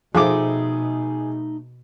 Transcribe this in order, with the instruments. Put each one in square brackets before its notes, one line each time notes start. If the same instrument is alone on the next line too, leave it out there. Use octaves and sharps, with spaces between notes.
[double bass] B2 [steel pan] F3 A4 [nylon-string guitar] A3 D#4 G5 [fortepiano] G#4 D6